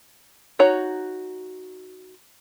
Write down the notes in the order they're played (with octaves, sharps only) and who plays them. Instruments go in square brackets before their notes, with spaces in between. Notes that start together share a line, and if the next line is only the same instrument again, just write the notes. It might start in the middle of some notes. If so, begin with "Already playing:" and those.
[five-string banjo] D#4 F#4 C#5 A#5